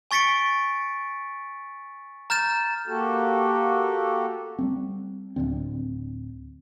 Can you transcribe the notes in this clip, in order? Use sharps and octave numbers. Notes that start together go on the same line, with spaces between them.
G#5 C#6 A6 B6 C#7 D7
A#5 F6 G6 A6 E7
A#3 F#4 G4 A4
G3 A3 C4
D1 G1 D3 C4